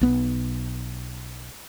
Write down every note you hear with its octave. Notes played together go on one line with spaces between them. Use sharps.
B1 B3